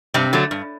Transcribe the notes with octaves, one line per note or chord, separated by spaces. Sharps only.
G2 C3 C4
D3 F#3 A3
G2